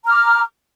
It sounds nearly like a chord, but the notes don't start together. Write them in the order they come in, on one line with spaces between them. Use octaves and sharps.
A#5 F6 D6